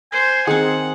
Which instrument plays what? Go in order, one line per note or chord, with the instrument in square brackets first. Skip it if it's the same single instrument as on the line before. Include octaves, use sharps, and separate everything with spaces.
[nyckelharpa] C5 [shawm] G#5
[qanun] D#3 C4 [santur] G#4 [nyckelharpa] F#5